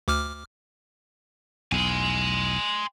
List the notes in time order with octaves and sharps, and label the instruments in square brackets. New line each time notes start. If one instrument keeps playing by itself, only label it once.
[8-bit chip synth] D2 D6 F6
[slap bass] B1 E2 [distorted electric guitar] G#5 C6